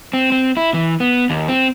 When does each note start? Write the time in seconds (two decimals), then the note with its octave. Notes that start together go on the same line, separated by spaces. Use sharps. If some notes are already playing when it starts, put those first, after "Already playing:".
0.13 C4
0.32 C4
0.57 E4
0.74 E3
1.00 B3
1.30 D#2
1.48 C4